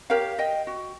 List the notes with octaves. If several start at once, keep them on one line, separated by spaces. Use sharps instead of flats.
G4 A#4 C#5 F5
D#5 G5
F#4